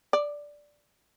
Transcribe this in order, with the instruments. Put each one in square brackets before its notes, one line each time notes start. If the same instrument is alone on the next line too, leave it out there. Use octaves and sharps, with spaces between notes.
[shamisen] D5